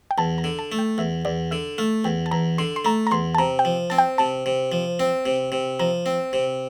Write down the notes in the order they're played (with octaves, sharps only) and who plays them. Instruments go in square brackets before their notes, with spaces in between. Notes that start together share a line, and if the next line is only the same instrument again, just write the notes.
[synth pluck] G5
[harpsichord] E2 [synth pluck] A5
[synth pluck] A#5
[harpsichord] D3
[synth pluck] A5
[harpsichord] A3
[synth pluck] G5
[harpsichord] E2 [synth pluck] E5
[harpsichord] E2 [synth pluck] D5
[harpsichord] D3 [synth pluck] E5
[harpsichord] A3 [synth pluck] F5
[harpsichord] E2 [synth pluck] G5
[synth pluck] A5
[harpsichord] E2 [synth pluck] A#5
[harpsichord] D3 [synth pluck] C6
[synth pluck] C6
[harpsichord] A3 [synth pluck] A#5
[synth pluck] A#5
[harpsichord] E2 [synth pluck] C6
[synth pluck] A5
[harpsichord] C3 [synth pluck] A#5
[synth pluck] G5
[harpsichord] F3
[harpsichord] C4 [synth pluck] A5
[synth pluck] G5
[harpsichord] C3 [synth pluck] A5
[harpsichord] C3
F3
C4
C3
C3
[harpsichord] F3 [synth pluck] A#5
[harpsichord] C4
C3